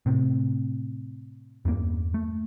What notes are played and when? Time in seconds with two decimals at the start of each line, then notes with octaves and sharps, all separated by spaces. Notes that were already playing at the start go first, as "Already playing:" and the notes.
0.06 A2 C3
1.65 E2 G2 A3 A#3
2.14 A3